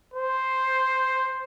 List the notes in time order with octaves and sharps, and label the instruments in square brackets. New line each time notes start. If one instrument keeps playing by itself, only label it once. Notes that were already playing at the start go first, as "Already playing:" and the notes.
[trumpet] C5